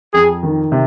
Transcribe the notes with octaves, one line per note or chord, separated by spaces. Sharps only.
F2 G#4
D#3
C3